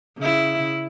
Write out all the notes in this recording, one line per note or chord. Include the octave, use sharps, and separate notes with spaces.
C#3 E4